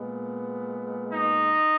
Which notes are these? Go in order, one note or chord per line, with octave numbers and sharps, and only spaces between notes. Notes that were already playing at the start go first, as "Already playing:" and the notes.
Already playing: A#2 G#3 B3
D#4